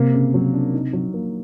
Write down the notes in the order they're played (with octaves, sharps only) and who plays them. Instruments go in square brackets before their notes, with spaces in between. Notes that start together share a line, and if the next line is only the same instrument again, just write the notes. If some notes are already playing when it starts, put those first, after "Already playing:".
Already playing: [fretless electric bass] C3 [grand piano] A#3
[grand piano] C#3
F#3
D4
D#4
F#3
A#3